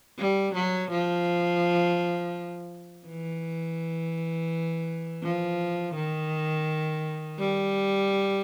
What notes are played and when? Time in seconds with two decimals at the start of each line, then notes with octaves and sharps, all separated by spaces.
0.19 G3
0.55 F#3
0.91 F3
3.07 E3
5.23 F3
5.96 D#3
7.39 G3